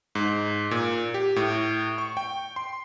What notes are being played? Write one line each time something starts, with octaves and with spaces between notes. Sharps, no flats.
G#2
A#2
G4
A2
C#6
G5
C6